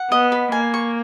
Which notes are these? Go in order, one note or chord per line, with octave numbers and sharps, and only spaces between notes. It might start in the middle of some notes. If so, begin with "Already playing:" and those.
Already playing: F#5
B3 D#5
B4
A#3 G#5
C#6